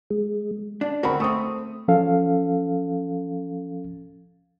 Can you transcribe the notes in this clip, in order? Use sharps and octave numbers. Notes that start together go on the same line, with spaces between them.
G#3
D4
D2 C4 F#4 A#4 B5
A3 C4 C#6 D#6
F3 C#4 A4 F5